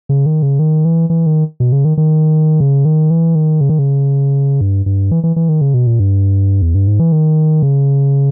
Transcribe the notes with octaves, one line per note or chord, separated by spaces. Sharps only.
C#3
D#3
C#3
D#3
E3
E3
D#3
B2
C#3
D#3
D#3
C#3
D#3
E3
D#3
C#3
D#3
C#3
G2
G2
E3
E3
E3
D#3
C#3
B2
A#2
G2
E2
G2
G#2
E3
D#3
C#3